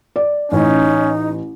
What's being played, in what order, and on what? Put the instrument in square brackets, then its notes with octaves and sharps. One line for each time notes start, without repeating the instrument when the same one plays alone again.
[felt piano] D5
[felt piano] A1 [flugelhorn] C#4 [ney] D#4